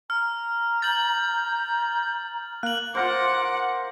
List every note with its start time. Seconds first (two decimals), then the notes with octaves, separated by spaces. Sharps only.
0.10 A#5 F6
0.82 G6 A6 F#7
2.63 A#3 F#6 F#7
2.95 F4 A#4 C5 F#5 D6